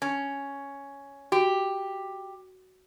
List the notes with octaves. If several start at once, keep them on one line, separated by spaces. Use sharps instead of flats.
C#4
F#4 G4